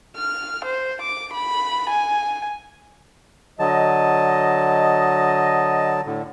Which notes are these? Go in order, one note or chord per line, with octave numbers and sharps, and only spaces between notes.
F6
C5
D6
B5
G#5
D3 F#3 D#5 A5
A2 D3